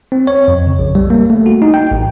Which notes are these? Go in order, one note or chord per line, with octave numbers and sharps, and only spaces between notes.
C4
C#5
F2
C#3
A#1
G3
A#3
A3
F#4
D#4
G5
A1